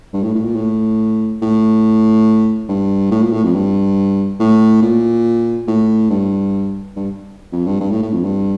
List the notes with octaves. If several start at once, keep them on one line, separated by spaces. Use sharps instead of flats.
G2
A2
A2
A#2
A2
A2
G2
A2
A#2
A2
F2
G2
A2
A#2
A2
G2
G2
F2
G2
G2
A2
A2
F2
G2